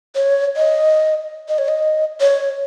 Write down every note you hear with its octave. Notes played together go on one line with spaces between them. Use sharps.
C#5
D#5
D#5
C#5
D#5
C#5